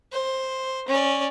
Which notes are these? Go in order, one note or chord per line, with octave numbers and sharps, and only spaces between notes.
C5
C#4 D5